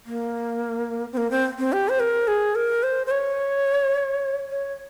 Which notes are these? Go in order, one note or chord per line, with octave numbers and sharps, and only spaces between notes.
A#3
C4
A#3
C4
C4
G4
C5
A#4
G#4
A#4
C5
C5
C#5
C#5